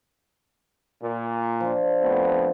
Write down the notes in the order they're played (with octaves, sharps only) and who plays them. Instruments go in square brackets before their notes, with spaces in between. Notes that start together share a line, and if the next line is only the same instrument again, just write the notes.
[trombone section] A#2
[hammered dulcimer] F3 D4
[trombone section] F2 A3 B3